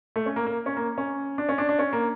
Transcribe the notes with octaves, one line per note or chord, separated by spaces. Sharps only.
A3
C#4
A#3
A#3
C#4
A#3
C#4
D4
C#4
D4
D4
C#4
A#3